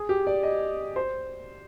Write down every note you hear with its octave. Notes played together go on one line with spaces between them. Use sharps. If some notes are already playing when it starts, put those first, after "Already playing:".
Already playing: G#4
G4
D5
D#5
C5